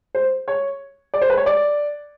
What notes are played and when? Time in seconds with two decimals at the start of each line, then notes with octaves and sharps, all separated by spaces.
0.15 C5
0.48 C#5
1.14 D5
1.22 C5
1.30 B4
1.37 C#5
1.46 D5